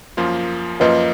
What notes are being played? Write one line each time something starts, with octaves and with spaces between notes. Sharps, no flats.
F#2 F3 A#3 F4
F#2 F3 A#3 F4 B4 D#5